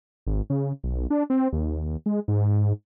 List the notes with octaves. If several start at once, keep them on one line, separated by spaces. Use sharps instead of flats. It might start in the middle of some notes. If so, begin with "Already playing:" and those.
G#1
C#3
B1
D4
C4
D#2
G#3
G#2